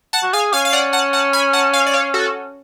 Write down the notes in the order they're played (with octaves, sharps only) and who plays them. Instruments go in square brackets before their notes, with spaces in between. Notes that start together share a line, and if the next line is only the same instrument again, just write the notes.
[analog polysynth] F#5 A5
[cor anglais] F#4
[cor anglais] G#4 [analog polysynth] F5 G#5
[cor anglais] C#4 [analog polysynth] F5 G#5
[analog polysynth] F5
D5 F#5
F#5 A5
F#5 A5
G#5 B5
F#5 A5
F5 G#5
D5
C#5 F5
F#4 A4